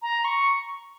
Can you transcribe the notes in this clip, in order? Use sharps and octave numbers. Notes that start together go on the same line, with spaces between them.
A#5
C#6